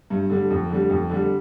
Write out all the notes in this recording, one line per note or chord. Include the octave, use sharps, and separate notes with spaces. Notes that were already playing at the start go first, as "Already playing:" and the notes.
G2
D3 G3
F2
D3 G3
F2
D3 G3